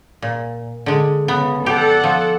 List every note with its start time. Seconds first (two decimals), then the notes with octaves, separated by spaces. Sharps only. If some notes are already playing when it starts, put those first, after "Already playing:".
0.22 A#2
0.86 D3 G#3
1.28 C#3 B3
1.66 G4 A4 D5 F#5
2.04 F3